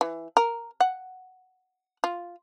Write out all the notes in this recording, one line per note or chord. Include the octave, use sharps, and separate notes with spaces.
E3
A#4
F#5
F4